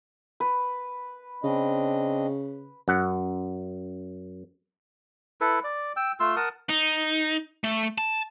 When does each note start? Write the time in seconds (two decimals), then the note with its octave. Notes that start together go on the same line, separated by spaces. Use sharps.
0.40 B4
1.44 C#3 C4 D4 D#5
2.88 F#2 F#5
5.41 E4 A4 B4
5.64 D5
5.96 G5 E6
6.20 A3 F4 C6 E6
6.36 A#4 F#5 A5 D#6
6.69 D#4
7.64 A3
7.98 A5